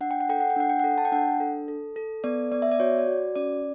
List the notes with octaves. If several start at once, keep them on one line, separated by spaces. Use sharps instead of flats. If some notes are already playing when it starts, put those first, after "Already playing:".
D4 F#5
G5
F#5
A4 G5
F#5
G5
D4 F#5
G5
A4 F#5
A5
G5
D4 F#5
A4
A4
A4
B3 D5
B3 D5
E5
D5
F#4 C#5
D5
F#4
C#4 D5